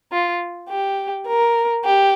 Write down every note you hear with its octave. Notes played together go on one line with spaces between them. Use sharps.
F4
G4
A#4
G4